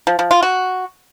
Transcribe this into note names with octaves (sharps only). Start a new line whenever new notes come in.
F3
F3
F4
F#4